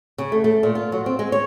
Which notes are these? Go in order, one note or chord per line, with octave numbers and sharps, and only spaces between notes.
C#3
A3
A3
A#2
F4
F#3
C4
G#3
C#5